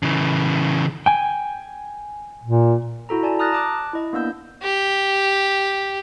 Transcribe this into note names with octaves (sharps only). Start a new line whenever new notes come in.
C#3 E3
G5 G#5
A#2
E4 F#4 A4 A#5
D5 G#5 A5
A#5 D#6 F6 F#6 A6 A#6
A5 D6 F#6
E4 D#5
A#3 B3 D4 E6 G6
G4